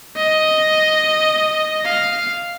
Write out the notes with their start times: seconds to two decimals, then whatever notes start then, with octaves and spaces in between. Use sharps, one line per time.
0.17 D#5
1.85 F5